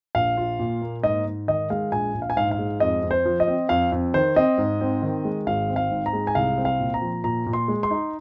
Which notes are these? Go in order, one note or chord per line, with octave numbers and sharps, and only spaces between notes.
A#1 F5
F4
A#2
A#3
G#2 D#5
G#2
D#3 D#5
G#3 F5
A#1 G#5
A#1
F5
G#5
G#2 F5
F5
G#3
F2 D#5
F2
C5
F3
D#5
C4
F2 F5
F2
D#3 C5
C4 D#5
G#2
C4
D#3
G#3
G#1 F5
C4
F5
G#2
A#5
G#3
G#5
C2 F5
C4
F5
A#2
A#5
F3
A#2 A#5
A#2
C6
G#3
C6
D#4